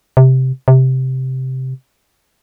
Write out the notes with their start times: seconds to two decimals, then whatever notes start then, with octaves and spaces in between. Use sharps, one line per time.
0.17 C3
0.68 C3